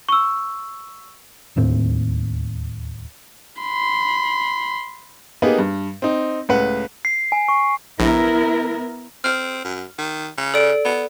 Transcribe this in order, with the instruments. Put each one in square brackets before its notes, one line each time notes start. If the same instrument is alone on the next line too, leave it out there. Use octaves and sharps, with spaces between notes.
[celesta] C#6 E6
[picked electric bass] D1 D#2 A2 C4
[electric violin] B5 C6
[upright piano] A#3 B3 D#4 G4 G#4 B4
G2
C4 D#4
C#2 A2 B4 F#5
[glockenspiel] C7
G#5
C#6
[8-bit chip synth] A#1 [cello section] B3 E4 A#4
[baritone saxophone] C4 [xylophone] F6
[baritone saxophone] F#2
D#3
C#3
[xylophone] A4 D5 D7
[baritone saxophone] B3